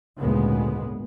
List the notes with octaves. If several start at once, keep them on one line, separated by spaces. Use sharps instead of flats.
G#1 D2 A#2 C#3 G#3 B3